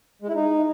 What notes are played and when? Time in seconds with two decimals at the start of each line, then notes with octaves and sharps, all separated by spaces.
0.22 G#3
0.28 E4
0.35 D#4